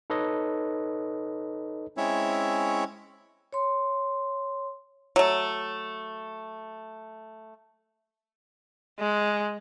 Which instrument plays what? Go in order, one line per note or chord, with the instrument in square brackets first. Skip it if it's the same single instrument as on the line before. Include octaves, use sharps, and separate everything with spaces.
[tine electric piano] D#4 A4 B4 C#5 D#5
[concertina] G#3 C4 C#4 E4 C#5 E5
[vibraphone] C#5 C6
[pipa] F#3 A3
[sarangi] G#3